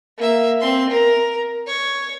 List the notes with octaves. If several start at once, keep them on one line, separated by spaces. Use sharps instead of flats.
A#3 E5
C4 C6
A#4
C#5